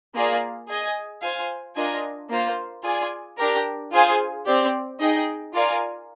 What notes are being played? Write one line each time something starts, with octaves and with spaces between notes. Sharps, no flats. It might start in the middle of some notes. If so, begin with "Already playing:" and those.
A#3 F4 G#4 D5 F5
G#4 D#5 G#5
F4 C5 F5 G#5
D4 F4 A#4 D#5 G#5
A#3 F4 C5 F5
F4 G#4 D5 G#5
D4 G4 A#4
F4 G#4 C5 F5 G#5
C4 G4 D5
D#4 G#4 D#5 G5
F4 A#4 D5 F5 G#5